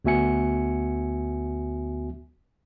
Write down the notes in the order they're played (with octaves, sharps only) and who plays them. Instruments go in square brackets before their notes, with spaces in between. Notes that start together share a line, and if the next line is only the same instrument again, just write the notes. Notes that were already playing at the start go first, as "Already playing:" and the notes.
[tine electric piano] D2 B3 F#4 E5 G#5 C#7